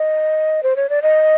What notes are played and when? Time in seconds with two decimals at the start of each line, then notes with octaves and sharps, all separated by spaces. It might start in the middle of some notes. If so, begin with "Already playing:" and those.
Already playing: D#5
0.63 C5
0.76 C#5
0.89 D5
1.02 D#5